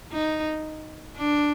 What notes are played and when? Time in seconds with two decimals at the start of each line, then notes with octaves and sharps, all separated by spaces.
0.12 D#4
1.18 D4